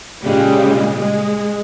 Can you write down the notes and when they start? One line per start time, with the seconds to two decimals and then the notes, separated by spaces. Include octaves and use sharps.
0.24 A#2 C#3 G3 G#3
0.96 G#3